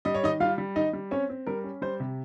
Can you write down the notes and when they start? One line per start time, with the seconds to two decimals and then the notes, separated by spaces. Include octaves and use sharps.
0.05 G3 D#5
0.15 C#5
0.23 D#3 D#4 D#5
0.40 G3 F4 F5
0.58 G3
0.75 D#3 D#4 D#5
0.93 G3
1.11 C4 C#4 C#5
1.29 C4
1.47 G3 A#4
1.64 C#4
1.82 G3 C5
2.00 C3